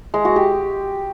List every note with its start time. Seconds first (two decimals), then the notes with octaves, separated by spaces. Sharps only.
0.14 G#3
0.25 F#4
0.36 G4